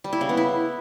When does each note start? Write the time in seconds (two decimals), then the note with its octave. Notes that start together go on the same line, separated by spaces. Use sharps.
0.04 G3
0.13 E4
0.21 C#3
0.29 B3
0.37 E4